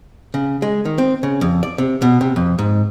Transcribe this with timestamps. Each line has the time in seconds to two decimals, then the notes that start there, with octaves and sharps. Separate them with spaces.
0.34 C#3
0.62 G#3
0.85 D#3
0.98 C4
1.23 C#3
1.41 F2
1.63 D5
1.78 C3
2.02 B2
2.21 C3
2.36 F2
2.59 G#2